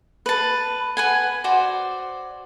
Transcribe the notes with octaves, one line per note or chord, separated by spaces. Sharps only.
B4 A5
B4 F#5 G#5
F#4 C5 D5